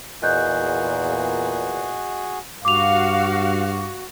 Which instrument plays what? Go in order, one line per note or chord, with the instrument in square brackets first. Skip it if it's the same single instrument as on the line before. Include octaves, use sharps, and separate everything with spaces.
[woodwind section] E2 A#2 [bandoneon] F#4 G#4 [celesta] D#5 F#6 G6
[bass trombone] G2 [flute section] F#4 [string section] F5 [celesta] D6 F7